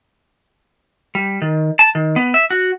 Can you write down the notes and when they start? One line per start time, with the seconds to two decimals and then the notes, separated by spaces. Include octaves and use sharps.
1.15 G3
1.42 D#3
1.79 A5
1.95 D#3
2.16 B3
2.34 E5
2.50 F#4